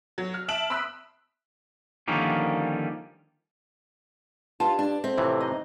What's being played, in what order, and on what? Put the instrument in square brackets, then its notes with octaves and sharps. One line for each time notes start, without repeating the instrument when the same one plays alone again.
[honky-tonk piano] F#3
F6
E5 A5 F6 D7 E7 F#7
B5 C6 D#6 E6 F#6 B6
[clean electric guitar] D3 D#3 F3 G3 A#3 C#4
[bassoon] G2 [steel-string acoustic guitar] F4 [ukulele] A5
[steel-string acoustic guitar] D4
[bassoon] F2 [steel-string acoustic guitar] C4 [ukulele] E5
[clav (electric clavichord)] A2 C3 E3
[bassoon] D#4 [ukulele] D#5